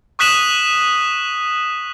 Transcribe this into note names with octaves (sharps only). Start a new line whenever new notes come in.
C#6 D#6 F#6 B6 E7 F#7